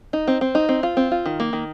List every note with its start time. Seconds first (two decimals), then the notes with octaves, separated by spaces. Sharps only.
0.13 D#4
0.27 C4
0.41 C4
0.55 D#4
0.69 C4
0.83 F4
0.97 C4
1.11 F4
1.26 D#3
1.40 A#3
1.53 D#3